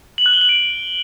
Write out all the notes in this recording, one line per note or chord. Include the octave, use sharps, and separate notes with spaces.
F#7
F#6
G7
F#7
D7